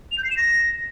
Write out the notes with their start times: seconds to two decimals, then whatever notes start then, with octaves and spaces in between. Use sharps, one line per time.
0.12 F7
0.18 G6
0.24 C7
0.31 E7
0.37 A#6